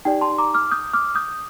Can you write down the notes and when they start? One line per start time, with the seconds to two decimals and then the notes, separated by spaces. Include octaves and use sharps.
0.05 D#4 G4 D5 G5
0.21 A5 C6
0.38 A#5 D6
0.54 D6 F6
0.71 D#6 G6
0.93 D6 F6
1.15 D#6 G6